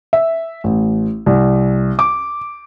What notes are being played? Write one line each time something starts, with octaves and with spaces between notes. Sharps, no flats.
E5
A1
C2
D6